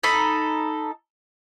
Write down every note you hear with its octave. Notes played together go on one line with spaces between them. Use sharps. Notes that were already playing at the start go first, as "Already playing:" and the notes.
D#4 A4 B5